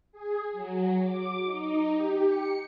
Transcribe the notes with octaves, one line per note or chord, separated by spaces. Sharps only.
G#4
F#3
D6
D#4
G4
C#7